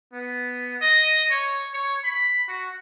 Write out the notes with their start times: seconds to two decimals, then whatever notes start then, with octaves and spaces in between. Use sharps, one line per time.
0.13 B3
0.81 D#5
1.31 C#5
1.74 C#5
2.04 B5
2.48 F#4